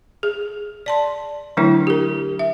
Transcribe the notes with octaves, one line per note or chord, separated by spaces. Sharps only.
G#4
D5 A5 C6
D3 E3 F#3 A3 D4 E4
G4 A#4
E5